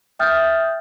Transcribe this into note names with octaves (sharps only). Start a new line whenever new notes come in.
E5 G5 D#6 F6 G6 A6